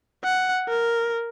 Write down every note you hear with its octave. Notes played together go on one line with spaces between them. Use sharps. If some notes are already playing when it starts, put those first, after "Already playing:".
F#5
A#4